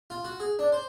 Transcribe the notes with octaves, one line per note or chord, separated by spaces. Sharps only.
F4
F#4
G#4
D4
C5